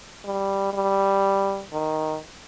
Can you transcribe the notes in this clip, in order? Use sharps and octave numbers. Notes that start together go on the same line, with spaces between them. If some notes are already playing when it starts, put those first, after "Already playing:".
G3
G3
D#3